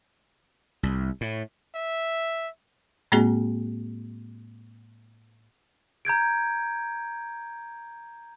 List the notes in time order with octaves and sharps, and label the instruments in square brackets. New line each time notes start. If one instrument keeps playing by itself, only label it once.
[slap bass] C2
A2
[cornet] E5
[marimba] A2 G#3 A#3 C4 F#4 G#4
[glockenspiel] A#5 G6 G#6 D7